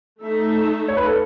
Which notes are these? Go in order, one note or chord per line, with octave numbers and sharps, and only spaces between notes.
A3 D#4 A4 E5
C#5
B4
A4